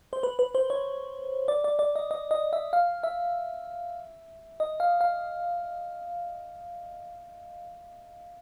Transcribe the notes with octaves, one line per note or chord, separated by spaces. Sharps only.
C5
B4
B4
C5
C#5
D5
D5
D5
D#5
D#5
D#5
E5
F5
E5
D#5
F5
F5